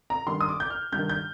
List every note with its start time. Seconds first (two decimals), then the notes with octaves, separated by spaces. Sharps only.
0.10 A#5
0.27 G2 D#3 C6
0.41 D#6
0.49 D6
0.60 G6
0.70 F6
0.92 G2 D#3 G6
1.09 G6